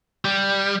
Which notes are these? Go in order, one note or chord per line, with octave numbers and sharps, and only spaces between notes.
G3